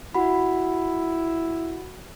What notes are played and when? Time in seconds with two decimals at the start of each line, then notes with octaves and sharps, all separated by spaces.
0.14 E4 F#4 F#5 B5